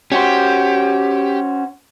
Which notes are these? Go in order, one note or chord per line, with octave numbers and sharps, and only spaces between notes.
C#4 F#4 G4 C5